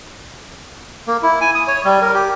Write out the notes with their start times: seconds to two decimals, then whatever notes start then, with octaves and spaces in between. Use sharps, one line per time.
1.07 A#3
1.22 E4
1.41 G#5
1.55 D#6
1.68 C#5
1.85 G3
2.02 A#4
2.14 G4